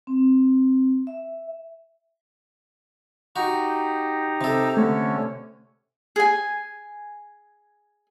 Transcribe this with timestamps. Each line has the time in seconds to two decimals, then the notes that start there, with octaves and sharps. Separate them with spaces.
0.07 C4
1.07 E5
3.36 D#4 F#4 G4 A#5
4.41 C3 A4
4.77 D3 A3 C#4 C#5
6.16 G#4 G#5